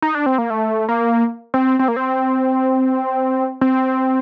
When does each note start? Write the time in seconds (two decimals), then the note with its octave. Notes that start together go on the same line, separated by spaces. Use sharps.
0.02 D#4
0.15 D4
0.26 C4
0.38 A#3
0.50 A3
0.89 A#3
1.54 C4
1.79 C4
1.88 A#3
1.96 C4
3.61 C4